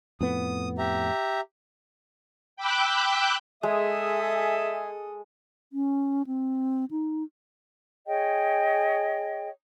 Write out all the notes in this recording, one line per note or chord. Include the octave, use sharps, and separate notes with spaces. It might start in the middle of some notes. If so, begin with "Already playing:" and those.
F2 A2 B3 D#6
G4 E5 A#5
G5 B5 D6 E6 F#6 G6
G#3 G#4 A4 E5 D#6
C#4
C4
D#4
G#4 C#5 D#5 G5